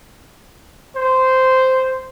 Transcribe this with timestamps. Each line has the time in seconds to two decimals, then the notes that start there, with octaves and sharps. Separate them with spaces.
0.96 C5